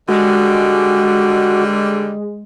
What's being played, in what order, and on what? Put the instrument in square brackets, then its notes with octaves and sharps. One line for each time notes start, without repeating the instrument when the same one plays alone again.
[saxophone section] D3 D#3 G3 [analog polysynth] G#3 [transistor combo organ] F#4